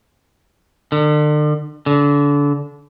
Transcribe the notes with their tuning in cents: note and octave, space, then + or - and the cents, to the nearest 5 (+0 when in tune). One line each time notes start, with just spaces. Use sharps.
D3 +40
D3 -30